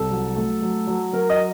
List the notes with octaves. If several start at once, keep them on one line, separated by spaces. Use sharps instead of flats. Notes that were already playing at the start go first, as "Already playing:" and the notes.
Already playing: C2 A4
F#3
A3
F#3
F#3
F#3 A#4
D#5